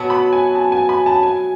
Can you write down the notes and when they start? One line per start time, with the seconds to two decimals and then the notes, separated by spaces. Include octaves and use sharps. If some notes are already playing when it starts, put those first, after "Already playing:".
Already playing: B2 F#3 B3 F#4 A5
0.10 B5
0.33 G#5
0.55 A5
0.72 G#5
0.89 B5
1.06 A5
1.23 G#5